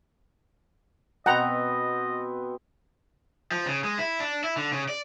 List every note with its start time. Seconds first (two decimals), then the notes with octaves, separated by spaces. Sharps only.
1.26 B2 B3 C4 D#5 F#5 G5 A#5
3.51 F3
3.66 C#3
3.84 G#3
3.98 E4
4.20 D4
4.44 E4
4.57 D3
4.73 C#3
4.89 D5